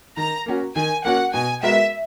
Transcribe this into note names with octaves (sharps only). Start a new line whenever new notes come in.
D#3 A#5
A#3 C#4 F#4
D#3 G#5
A#3 C#4 F#4 F#5
B2 G#5
G#3 B3 F#4 A#4 E5